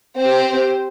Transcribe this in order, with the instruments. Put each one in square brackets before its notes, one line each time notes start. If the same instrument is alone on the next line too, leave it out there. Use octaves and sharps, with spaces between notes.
[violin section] C4 G4 C5